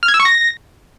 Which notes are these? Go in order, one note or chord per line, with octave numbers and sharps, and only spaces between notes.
F6
G#6
E6
C#6
A#6